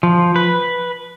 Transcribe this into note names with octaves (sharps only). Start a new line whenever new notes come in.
F3
B4